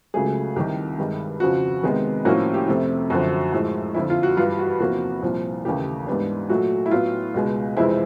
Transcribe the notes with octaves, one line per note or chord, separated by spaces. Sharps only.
C#2 C#3 F#3 A3 G#4
C2 C3 D#3 G4
G2 D#3 G#3
F2 C#3 F3 F#4
C3 D#3 G#3 B3
A2 F3 A#3 C#4 F#4
G4
F2 C3 F3 A3
F#2 D3 F3 F#4
A2 F3 G#3
F2 D3 F3 E4
F4
F#4
G2 E3 G3 F4
F#4
E2 C3 F3 A#3 F#4
C2 A#2 F3
D#2 C#3 E3 A3 G4
G#2 E3 G3 B3 D4
A#2 F#3 A3 F#4
E4
A2 F#3 B3 F4
C#2 B2 G#3
F2 C3 E3 G#3 C4 E4